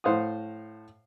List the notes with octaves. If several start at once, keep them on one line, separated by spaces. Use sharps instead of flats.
A2 C5 F5 F#5 D#6